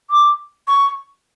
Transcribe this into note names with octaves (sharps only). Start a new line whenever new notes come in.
D6
C#6